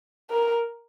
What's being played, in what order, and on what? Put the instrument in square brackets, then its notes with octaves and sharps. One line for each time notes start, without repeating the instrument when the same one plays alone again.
[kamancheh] A#4